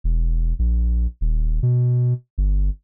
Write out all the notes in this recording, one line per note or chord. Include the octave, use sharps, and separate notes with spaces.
E1
A#1
D#1
B2
G1